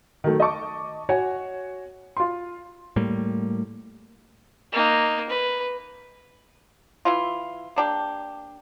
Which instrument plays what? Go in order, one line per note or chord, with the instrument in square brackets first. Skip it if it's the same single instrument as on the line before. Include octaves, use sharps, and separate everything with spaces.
[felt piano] D#3 F#3 A3
D#5 A5 C#6 D6
F#4 C#5 F#5 G#5
F4 C6
[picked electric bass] A2 G3 A#3
[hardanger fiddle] A#3 D#4
B4
[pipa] E3 E4 F4
A#3 D4 G4